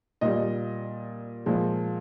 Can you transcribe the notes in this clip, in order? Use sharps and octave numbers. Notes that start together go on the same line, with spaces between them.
A#2 G3 D#5
A#2 F3 G#3